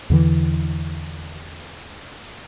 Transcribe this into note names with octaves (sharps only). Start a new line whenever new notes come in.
E2 D3 E3